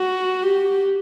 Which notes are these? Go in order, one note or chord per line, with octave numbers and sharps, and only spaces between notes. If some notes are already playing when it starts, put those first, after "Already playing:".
Already playing: F#4
G4